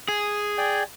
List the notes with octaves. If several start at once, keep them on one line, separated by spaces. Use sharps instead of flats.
G#4
D5 G5 G#5